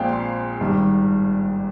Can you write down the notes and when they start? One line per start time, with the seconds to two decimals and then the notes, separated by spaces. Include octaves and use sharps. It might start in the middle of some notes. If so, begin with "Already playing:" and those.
Already playing: A#1 A#2 G#3 C4 F5 G5
0.09 C6
0.61 G#1 G2 D#3 G3